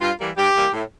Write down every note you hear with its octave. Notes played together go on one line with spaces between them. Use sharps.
G2 F4
E3 G3 A#3
G2 G4
E3 G3 A#3
A2